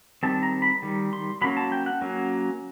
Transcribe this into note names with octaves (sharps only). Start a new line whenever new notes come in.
D#3 G3 C4 A5
A#5
B5
D#3 G3
C6
F#3 A#3 C#4 B5
A5
G5
F#5
F#3 A#3 C#4